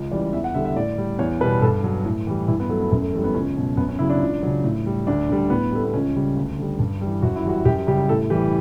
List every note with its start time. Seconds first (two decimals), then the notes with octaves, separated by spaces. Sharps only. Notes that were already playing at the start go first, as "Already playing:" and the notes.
Already playing: C#2
0.11 C#3 E3 G3 D5
0.33 E2 E5
0.44 F#5
0.54 D3 G3 E5
0.65 E5
0.76 A2 D5
0.98 G3
1.18 E2 C#5
1.40 B2 G3 B4
1.62 G2 A4
1.84 F#3
2.05 A2
2.27 E3 G3
2.48 G2 E4
2.60 B3
2.69 F#3 A3
2.81 B3
2.91 F#2 C#4
3.02 A3
3.13 E3 A3
3.17 G3
3.24 B3
3.34 C#2 C#4
3.57 B2 F#3
3.77 F#2 B3
3.89 C#4
3.99 C#3 E4
4.02 F#3
4.10 D4
4.21 C#2
4.43 C#3 F#3
4.64 A2
4.86 G3
5.07 D2 D4
5.29 D3 G3
5.50 A2 B3
5.72 G3 A3
5.84 B3
5.94 C#2 C#4
6.16 C#3 G3
6.37 D2
6.58 D3 G3
6.79 G2
7.01 E3 G3
7.22 F#2 F#4
7.36 E4
7.45 E3 G3 F#4
7.65 F#2 G4
7.87 C#3 G3 G4
8.09 A2 A4
8.30 E3 G3 G4